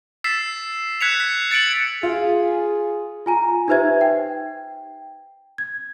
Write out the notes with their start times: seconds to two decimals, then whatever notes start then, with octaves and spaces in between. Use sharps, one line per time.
0.24 E6 A6 B6 C7 E7
1.01 F#6 G#6 B6 C#7 E7 F7
1.20 B6
1.51 A6 C#7 D7 F#7
2.03 F4 G#4
3.26 F4 G#5 A#5
3.68 D#4 G4 B4 C5 E5 G#6
4.01 G5
5.58 G#6